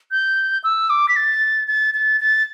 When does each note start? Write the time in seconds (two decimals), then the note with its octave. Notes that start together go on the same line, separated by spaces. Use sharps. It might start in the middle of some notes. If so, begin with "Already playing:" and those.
0.11 G6
0.64 E6
0.90 D6
1.09 B6
1.16 A6
1.68 A6
1.94 A6
2.20 A6